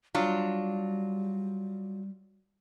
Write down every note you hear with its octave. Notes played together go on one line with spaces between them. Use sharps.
F#3 G3 D4 F4